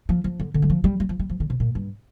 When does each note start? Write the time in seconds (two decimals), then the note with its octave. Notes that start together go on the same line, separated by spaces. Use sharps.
0.09 F3
0.24 F3
0.40 D3
0.54 D3
0.62 G3
0.70 F3
0.84 G3
1.00 G3
1.09 F3
1.19 G3
1.30 F3
1.40 D3
1.50 C3
1.60 A#2
1.75 G2